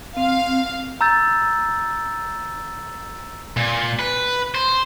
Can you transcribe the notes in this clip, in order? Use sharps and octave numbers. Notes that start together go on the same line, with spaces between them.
C4 F5
A#5 E6 G6 A6
A#2
B4
C5